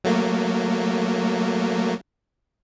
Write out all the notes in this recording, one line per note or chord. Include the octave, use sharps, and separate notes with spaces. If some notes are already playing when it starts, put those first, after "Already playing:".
F#3 A3 A#3